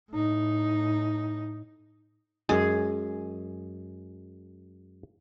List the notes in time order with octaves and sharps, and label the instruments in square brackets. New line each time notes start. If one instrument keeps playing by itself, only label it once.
[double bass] A2 D#4
[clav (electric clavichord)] F#2 G#3 [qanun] G#4